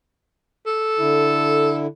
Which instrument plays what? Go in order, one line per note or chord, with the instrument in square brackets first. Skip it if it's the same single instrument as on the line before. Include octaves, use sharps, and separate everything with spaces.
[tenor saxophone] A4
[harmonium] D3 E4